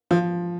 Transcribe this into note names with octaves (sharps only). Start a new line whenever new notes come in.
F3